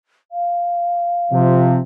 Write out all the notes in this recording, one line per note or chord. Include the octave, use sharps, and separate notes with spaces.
F5
C3 F3